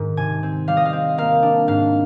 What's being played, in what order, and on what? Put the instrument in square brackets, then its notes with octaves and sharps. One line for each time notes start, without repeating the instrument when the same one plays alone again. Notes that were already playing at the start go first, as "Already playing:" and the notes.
Already playing: [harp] G#2 D#3 G#3
C3 G#5
C4
G3 F5
D#5
F5
C4
A#3 F5
D4
G#2 F5